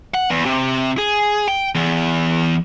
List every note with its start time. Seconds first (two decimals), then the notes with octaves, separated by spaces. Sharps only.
0.14 F#5
0.31 E2
0.46 C3
0.98 G#4
1.48 G5
1.75 E2